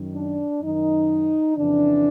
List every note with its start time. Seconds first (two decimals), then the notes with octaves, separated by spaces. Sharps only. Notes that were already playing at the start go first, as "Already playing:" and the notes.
Already playing: F#2 D#3
0.14 D4
0.62 F#2 D#3 D#4
1.56 F2 C#3 E3 D4